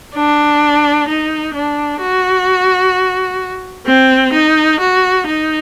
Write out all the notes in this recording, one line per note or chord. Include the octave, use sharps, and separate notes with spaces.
D4
D#4
D4
F#4
C4
D#4
F#4
D#4